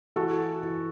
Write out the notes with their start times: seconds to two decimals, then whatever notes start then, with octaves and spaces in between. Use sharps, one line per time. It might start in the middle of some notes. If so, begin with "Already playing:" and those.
0.16 E3 F#4 A4
0.63 E3